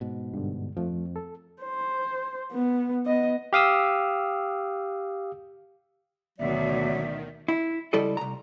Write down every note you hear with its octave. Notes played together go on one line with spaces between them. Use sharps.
G#2 B2
G2 D3
F2 F3 A3
A4
C5
B3
B3 D#5
G4 F5 D#6 E6
D2 B2 D#3 F#3 D5 E5
E4
C#2 G3 E4 A4 D5 D#5
C2 A#5